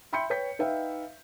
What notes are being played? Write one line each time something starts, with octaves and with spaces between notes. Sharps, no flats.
E5 G5 B5 C6 G6 C#7
B4 C#5 G5 G6 B6
D#4 B4 E5 F5 G5